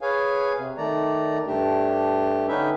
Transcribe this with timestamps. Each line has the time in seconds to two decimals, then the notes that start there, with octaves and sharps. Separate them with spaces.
0.01 G#4 B4 C#5 F5 G#5
0.57 C3
0.77 D#3 A3 D5 A#5
1.47 G2 A3 D4 G4
2.48 D3 C#4 D#4 B4 E5 G5